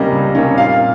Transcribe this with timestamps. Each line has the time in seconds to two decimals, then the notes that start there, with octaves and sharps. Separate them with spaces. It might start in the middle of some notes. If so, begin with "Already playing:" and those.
Already playing: C#2 C3 G3 A#3 C#4 D#5
0.12 C#2
0.35 C3 G3 A#3 C#4
0.57 A#2 F5